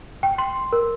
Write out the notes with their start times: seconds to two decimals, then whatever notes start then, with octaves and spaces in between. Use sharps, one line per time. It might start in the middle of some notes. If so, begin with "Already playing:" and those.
0.23 G5
0.38 C6
0.73 A#4